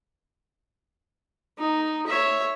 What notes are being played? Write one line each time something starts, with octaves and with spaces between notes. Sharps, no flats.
D#4
C#5 E5